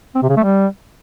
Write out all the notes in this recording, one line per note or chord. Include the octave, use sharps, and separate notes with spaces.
C4
C3
C#3
A3
G3